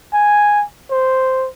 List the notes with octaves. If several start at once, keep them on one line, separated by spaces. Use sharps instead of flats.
G#5
C5